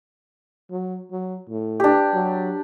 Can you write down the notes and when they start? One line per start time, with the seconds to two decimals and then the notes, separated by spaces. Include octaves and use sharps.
0.71 F#3
1.11 F#3
1.49 A2
1.80 D4 G4
2.13 F#3